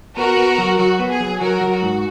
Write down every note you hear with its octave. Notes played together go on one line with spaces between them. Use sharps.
B3 F#4 A#4
B3
F#3
F#3 F#4
B3
G#4
F#3
F#3 F#4 A#4
F#3
F#4
G#2